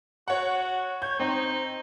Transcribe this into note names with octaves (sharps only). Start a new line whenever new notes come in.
F#4 C#5 F#5
C#5 G6
C4 D#4 C5